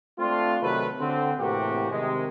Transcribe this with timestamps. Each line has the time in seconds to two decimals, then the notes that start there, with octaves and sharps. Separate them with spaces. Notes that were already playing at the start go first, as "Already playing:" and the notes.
0.19 A3 C4 D4 F4
0.62 C3 D#3 F#3 A3 B4
1.00 D3 C4
1.39 A2 C3 E3 A#3 F#4 G4
1.91 C3 D#3 G#3